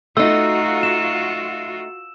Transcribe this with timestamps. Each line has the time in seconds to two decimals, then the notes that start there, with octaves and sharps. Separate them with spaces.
0.17 A3 D#4 F4 F#4 E6
0.83 E7